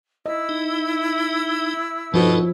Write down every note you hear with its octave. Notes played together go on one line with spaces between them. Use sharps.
E4 D#5 E6
D#4
G2 B2 F3 D#4 F#4 A4